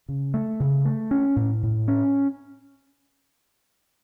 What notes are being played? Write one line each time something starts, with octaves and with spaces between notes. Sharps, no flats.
C#3
A3
C#3
A3
C#4
A2
A2
C#4